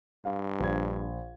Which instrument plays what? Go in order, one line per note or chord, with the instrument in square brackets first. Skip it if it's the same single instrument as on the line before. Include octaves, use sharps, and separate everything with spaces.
[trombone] G2 [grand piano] F5
[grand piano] A#1 G#6